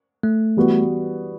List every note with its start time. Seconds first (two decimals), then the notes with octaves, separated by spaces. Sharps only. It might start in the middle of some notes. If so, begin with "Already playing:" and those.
0.23 A3
0.57 E3 G3 B3 F#4